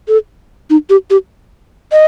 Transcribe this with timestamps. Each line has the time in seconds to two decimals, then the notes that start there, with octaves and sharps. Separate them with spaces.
0.08 A4
0.70 D#4
0.90 G4
1.10 G4
1.92 D#5